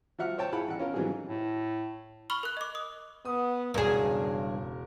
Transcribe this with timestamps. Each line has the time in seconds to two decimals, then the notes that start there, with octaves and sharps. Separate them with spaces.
0.18 F3 F#4 E5 F#5 F6
0.38 C5 C#5 G5 A5
0.52 E4 F4 G#4 F#5 B5
0.68 A1 F#5
0.79 C#4 F4 A#4
0.94 G#2 E3 F#3 G3 C4 G#4
1.27 A2
2.30 B5 C#6 F6 F#7 G7
2.43 A#4 F#6
2.57 D#5 D6
2.75 D#6
3.25 B3 D#6
3.74 E1 G2 C#3 G#4 A#4